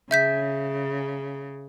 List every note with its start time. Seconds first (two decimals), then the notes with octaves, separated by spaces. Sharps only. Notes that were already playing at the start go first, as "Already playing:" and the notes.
0.11 C#3 E5 G6 B6